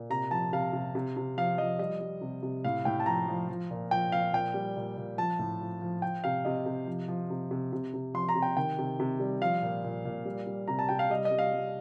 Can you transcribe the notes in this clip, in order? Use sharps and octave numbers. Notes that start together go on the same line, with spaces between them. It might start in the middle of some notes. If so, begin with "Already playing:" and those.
Already playing: A#2
C3 A#5
F3 A5
C3 F5
C3
C3
C3
F3 F5
F3 D#5
G3 D#5
G3
C3
C3
A2 F5
A2 G5
A5
F3 A#5
F3
F3
A#2
F3 G5
F3 F5
A#2 G5
G3
A#2
A#2
F3 A5
A2
F3
F3
F3 G5
C3 F5
C3 D#5
C3
F3
F3
C3
C3
C3
C3
F3 C6
A#5
C3
G5
D#3 G5
C3
C3
G3
F3 F5
A#2
A#2
A#2
G3
G3
C3 A#5
A5
C3 G5
F5
G3 D#5
D#5
G3
F5
G3